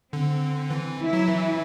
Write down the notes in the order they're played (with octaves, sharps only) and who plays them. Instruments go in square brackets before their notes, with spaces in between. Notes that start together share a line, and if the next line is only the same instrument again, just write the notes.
[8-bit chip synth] D3 [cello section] C4
[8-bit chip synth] E3
[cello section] E4
[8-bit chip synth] F#3
E3